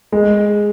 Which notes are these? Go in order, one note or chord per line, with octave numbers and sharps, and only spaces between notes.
G#3